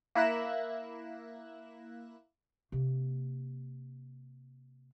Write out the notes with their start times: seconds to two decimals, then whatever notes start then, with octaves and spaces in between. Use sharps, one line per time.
0.15 A#3 E4 E5 F#6 A#6 E7
2.72 C3 A#3